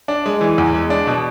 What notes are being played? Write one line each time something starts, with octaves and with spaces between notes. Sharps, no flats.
D4
G#3
E3
E2
G#3
D4
B2